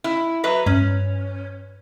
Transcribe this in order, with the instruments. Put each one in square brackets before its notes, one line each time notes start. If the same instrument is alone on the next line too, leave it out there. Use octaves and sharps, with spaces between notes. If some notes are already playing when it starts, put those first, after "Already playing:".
[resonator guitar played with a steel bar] E4
F#3 B4 E5
[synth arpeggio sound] G2 [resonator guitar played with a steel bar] C#4